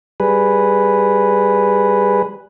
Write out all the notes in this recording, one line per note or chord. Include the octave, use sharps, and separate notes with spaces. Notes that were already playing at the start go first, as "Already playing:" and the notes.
G3 G#4 B4